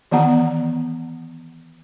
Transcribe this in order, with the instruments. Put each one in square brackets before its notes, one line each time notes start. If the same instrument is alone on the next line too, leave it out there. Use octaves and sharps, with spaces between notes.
[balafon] D#3 E3 B3 F#5 A#5